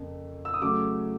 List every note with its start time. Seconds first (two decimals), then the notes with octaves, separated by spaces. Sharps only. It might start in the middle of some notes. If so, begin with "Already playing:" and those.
Already playing: F2 C#3 A#3
0.45 E6
0.54 D#6
0.61 C#3 F#3 A3 C#4 D6